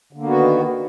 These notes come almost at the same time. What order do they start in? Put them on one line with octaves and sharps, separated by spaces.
D3 A#3 B3 F#4 D#3